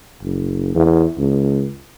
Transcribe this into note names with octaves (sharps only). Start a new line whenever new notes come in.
F#1
E2
C#2